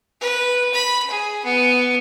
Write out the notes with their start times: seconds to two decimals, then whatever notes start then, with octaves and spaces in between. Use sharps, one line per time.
0.21 B4
0.74 B5
1.10 G#4
1.45 B3